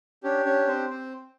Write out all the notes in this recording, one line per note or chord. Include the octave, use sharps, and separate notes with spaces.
C#4 D4 G4 C#5
C#4 C#5
C4 C5
C4 C5